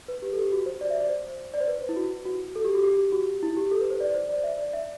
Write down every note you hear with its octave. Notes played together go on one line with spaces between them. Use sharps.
B4
G4
A4
G4
F#4
C5
D5
E5
D5
C5
D5
C5
B4
E4
F#4
F#4
A4
G4
F#4
G4
F#4
E4
G4
A4
B4
C5
D5
C5
D5
E5
D5
E5